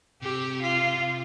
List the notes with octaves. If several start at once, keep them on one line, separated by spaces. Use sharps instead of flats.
C3 G4
F4